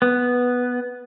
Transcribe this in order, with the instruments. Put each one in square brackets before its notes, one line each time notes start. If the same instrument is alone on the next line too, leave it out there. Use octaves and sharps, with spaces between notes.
[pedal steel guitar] B3